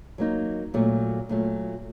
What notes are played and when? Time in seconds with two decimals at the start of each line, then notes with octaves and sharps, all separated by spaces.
0.18 F#3 A#3 D#4
0.74 A#2 F#3 A3
1.29 A#2 F#3 A3